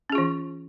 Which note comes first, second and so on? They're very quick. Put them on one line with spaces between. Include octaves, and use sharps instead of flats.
C#4 G#4 F4 E3